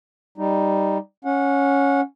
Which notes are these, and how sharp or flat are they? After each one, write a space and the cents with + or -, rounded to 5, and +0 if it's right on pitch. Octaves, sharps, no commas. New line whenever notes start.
G3 +0 D#4 +0
C#4 +0 F#5 -25